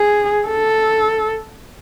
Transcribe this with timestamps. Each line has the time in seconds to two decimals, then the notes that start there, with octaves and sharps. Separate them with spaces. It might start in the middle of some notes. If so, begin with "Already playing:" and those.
Already playing: G#4
0.48 A4